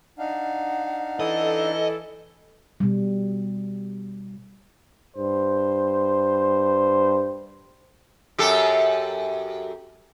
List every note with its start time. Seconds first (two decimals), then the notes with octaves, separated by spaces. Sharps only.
0.19 D4 D#4 F5 F#5
1.20 E3 A4 D#5
2.80 B2 G3
5.16 G2 C5
8.38 F#2 G4 A4